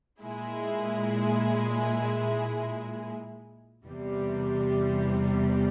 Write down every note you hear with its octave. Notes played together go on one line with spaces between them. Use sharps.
A#2 G#3 E4 G#4
E2 C3 E3 G3